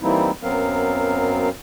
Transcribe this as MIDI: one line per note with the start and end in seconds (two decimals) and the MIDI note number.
0.01 0.31 52
0.01 0.31 55
0.01 0.31 58
0.01 0.31 60
0.01 0.31 63
0.01 0.31 64
0.43 1.49 42
0.43 1.49 54
0.43 1.49 59
0.43 1.49 60
0.43 1.49 70
0.43 1.49 77